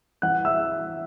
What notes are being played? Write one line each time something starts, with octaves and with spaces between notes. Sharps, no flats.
E3 F#5 F#6
E5 E6